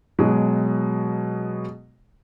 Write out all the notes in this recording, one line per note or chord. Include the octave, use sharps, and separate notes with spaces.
B2 F#3 G#3